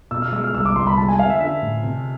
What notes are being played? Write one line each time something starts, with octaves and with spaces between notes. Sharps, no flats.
B2 E6
F6
G#3 E6
F6
C2 E6
D6
C2 C6
B5
G#3 A5
G#5
B3 F5
E5
D4 E5
A2
C3